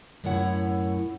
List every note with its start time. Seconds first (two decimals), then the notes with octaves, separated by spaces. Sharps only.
0.24 F#2 A2 E4 C#5 F#5